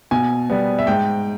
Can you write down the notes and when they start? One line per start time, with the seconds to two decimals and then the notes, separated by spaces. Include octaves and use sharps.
0.11 B2 G#5
0.50 G3 B3
0.79 E5
0.87 G#2 G5